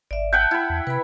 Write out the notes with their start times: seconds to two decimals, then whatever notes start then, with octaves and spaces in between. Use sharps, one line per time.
0.11 G#1 D5 E5
0.33 E5 F#5 G5 A5 G6
0.51 E4 B5
0.70 E2
0.87 C3 B4 B5